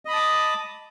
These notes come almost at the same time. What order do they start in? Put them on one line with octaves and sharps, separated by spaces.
D#5 B5 D#6 A5 D6